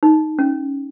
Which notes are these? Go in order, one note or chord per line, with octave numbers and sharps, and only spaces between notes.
D#4
C#4